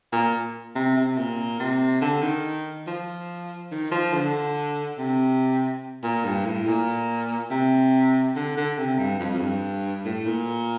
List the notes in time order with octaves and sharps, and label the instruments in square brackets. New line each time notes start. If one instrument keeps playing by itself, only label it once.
[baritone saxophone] A#2
C3
C3
A#2
C3
D3
D#3
F3
D#3
F3
D3
C3
A#2
G2
A2
A#2
C3
D3
D3
C3
G2
F2
F2
G2
A2
A#2